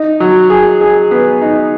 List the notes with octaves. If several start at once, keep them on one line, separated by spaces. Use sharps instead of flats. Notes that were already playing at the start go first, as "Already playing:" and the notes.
Already playing: D#4
F#3
G#4
G#4
B3
D#4